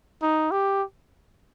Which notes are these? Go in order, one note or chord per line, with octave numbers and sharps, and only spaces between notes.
D#4
G4